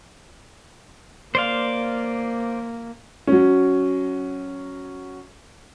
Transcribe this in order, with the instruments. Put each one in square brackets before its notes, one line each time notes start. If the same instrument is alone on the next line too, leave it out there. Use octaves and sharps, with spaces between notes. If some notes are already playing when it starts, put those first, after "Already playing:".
[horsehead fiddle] A#3 [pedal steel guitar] C5 D5 F5
[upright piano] F#3 C#4